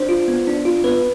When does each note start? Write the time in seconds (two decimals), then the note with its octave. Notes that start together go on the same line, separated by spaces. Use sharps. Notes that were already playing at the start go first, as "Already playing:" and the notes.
Already playing: D4 C5
0.09 F4
0.28 B3
0.47 D4
0.65 F4
0.84 B3 B4